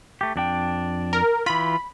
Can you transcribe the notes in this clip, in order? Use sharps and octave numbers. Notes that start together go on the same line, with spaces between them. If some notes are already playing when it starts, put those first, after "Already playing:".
A3 G4
F2 D4 G5
A#4
E3 F4 B5